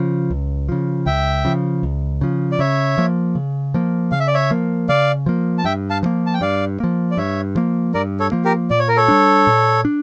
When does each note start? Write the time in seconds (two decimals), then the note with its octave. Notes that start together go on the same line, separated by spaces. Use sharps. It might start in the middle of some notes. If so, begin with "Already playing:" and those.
Already playing: C#3 F3
0.30 C#2
0.69 C#3 F3
1.06 C#2 E5 G5
1.45 C#3 F3
1.83 C#2
2.21 C#3 F3
2.52 D5
2.59 C#3 C#5 E5
2.98 F3 A#3
3.35 C#3
3.74 F3 A#3
4.12 C#3 F5
4.20 E5
4.27 D5
4.34 C#5 E5
4.51 F3 A#3
4.89 C#3 D5 F5
5.26 F3 A#3
5.58 A5
5.64 G2 E5 G5
5.90 F5 A5
6.03 F3 A#3
6.27 A5
6.34 G5
6.41 G2 D5 F5
6.80 F3 A#3
7.11 D5
7.17 G2 C#5 E5
7.55 F3 A#3
7.94 G2 A#4 D5
8.19 A4 C#5
8.32 F3 A#3
8.45 G4 A#4
8.70 A#2 D5
8.79 C#5
8.88 A#4
8.97 A4 C#5
9.08 G3 D4
9.47 A#2
9.85 D4